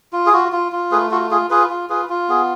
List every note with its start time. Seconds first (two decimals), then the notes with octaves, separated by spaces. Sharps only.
0.13 F4
0.26 G#4
0.33 F4 F#4
0.52 F4
0.72 F4
0.91 A3 G#4 B4
1.11 F4 F#4 A4
1.31 F4 G#4
1.50 F4 G#4 B4
1.70 F4
1.90 F4 G#4 B4
2.09 F4
2.28 B3 G#4